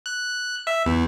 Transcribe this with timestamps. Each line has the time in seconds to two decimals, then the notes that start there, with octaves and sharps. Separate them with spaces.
0.06 F#6
0.30 F#6
0.67 E5
0.86 E2